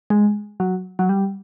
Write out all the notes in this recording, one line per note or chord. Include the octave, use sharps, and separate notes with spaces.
G#3
F#3
F#3
G3